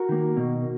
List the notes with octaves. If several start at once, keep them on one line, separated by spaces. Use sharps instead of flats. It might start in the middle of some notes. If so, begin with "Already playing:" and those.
Already playing: F#4 A#4
D#3 A#3
B2